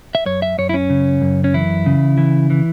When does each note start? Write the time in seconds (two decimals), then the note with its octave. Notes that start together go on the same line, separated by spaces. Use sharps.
0.15 E5
0.26 F#2 C#5
0.42 E5
0.58 F#2 C#5
0.69 E4
0.74 C#4
0.90 C#3
1.22 F#2
1.44 C#4
1.54 E3 E4
1.86 C#3
2.18 E3
2.50 E3